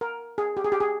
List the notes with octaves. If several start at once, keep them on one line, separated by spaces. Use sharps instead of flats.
A#4
G#4
G4
G#4
G4
G#4